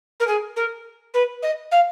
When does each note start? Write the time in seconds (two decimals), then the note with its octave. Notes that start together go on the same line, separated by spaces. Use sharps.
0.20 A#4
0.27 G#4
0.56 A#4
1.14 B4
1.42 D#5
1.71 F5